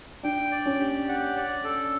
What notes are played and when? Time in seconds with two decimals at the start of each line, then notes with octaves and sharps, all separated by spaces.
0.23 D4 G5
0.51 D5
0.66 C#4
0.80 G4
1.09 F#5
1.37 D5
1.64 A4